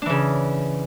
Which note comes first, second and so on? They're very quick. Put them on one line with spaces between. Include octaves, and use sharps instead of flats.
D4 E3 C#3